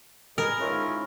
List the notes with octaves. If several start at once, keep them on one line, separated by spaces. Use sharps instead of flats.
G#4 A#4 B4 D#5
G#2 C#4 E4 F4